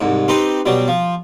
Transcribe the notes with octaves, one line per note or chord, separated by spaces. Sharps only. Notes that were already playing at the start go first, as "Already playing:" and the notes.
C2 G#2
C4 D#4 G4 B4
B2 F#3 G3
F3